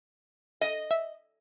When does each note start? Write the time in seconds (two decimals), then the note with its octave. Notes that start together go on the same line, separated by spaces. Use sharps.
0.61 D#5
0.91 E5